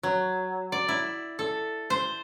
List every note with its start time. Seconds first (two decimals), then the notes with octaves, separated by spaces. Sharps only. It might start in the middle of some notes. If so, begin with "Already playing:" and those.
0.03 F#3
0.72 D5
0.89 E4
1.39 A4
1.90 C5